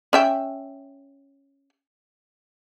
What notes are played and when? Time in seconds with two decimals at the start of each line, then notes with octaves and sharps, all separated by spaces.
0.13 C#4 E5 G5